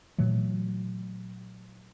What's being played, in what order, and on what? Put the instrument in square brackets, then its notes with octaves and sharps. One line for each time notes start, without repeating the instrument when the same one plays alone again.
[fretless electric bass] A#2 E3 F#3 A3